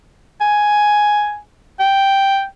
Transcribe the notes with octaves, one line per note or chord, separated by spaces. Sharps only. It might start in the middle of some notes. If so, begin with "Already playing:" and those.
G#5
G5